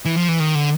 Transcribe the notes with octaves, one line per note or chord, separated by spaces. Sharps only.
E3
F3
E3
D#3
D3